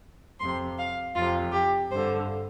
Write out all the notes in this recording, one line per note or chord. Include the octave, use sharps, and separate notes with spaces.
F2 C3 C6
F5
F2 C3 F4
G4
G2 D3 C5